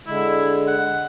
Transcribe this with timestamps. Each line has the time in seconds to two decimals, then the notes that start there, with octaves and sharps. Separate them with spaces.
0.07 D3 G#3 E4
0.68 F#5